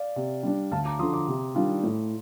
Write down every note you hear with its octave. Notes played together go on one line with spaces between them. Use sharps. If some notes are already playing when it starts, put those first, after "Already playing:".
Already playing: D5 F5
C3
G3 D4
D2 F5 A5
A#5 D6
D3 F3 C6 D#6
A#5 D6
C3
D#3 G3 D4 F4
A2